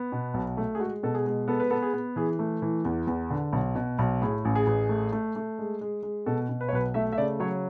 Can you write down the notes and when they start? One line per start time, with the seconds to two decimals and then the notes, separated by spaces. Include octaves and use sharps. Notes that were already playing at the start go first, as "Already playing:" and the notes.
Already playing: B3
0.12 B2
0.34 B1
0.57 A3
0.75 G#4
0.80 G#3 F#4
1.03 B2 A4
1.15 G#4
1.26 G#3
1.48 B3 A4
1.60 B4
1.71 B3 A4
1.82 G#4
1.94 B3
2.16 E3 G#4
2.39 A3
2.62 E3
2.85 E2
3.07 E2
3.30 D3
3.53 B1
3.75 B2
3.99 B1
4.22 A2 G#4
4.45 A1
4.55 G#4
4.67 A1
4.89 A3
5.12 A3
5.36 A3
5.59 G#3
5.81 G#3
6.03 G#3
6.26 B2 A4
6.49 B2
6.61 B4
6.69 C#5
6.72 B1 B4
6.94 A3 E5
7.12 E5
7.18 C#3 D5
7.40 F#3 C#5